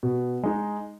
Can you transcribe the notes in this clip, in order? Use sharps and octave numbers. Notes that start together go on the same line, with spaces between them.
B2
G#3 D#4